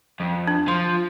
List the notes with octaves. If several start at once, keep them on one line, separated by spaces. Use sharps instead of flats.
F2
D4
F3 C6